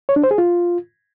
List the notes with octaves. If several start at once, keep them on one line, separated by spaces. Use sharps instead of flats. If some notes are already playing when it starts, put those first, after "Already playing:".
C#5
D4
C5
G#4
F4